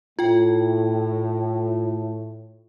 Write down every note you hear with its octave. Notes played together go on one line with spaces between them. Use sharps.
A2 F4 G5